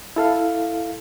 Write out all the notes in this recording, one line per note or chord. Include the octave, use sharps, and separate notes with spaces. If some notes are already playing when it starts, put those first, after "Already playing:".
E4 A4 F5